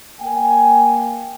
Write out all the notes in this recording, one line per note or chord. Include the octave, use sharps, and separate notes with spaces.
A#3 G5 G#5